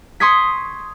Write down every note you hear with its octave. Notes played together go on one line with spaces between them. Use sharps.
C6 C#6 D#6 G#6 B6